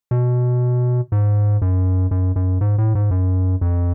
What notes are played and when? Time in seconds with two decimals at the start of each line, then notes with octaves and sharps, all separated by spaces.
0.11 B2
1.12 G#2
1.62 F#2
2.11 F#2
2.36 F#2
2.61 G#2
2.78 A2
2.95 G#2
3.11 F#2
3.61 F2